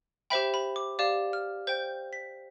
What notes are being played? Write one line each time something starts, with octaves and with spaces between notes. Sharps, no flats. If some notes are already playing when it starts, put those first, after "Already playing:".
G4 C5 E5 G5 B5
B5
D6
G4 D5 F5 D6
F6
C5 G5 G6
B6